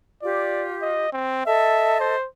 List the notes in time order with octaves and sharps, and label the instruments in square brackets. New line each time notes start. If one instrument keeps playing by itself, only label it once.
[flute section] F4 G4 [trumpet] D5
[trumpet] D#5
C4
[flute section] A4 D#5 A5 [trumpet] E5
[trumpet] C5